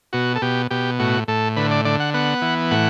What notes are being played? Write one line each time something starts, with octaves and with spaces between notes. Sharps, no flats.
B2 F#4
A4
B2 G4
B2 G4
A2 F#4
A2 A4
D3 B4
D5
D3 D5
F#5
B3 F#5
E3
A2 F#5